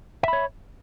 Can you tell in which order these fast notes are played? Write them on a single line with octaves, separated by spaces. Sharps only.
E5 B5 C#5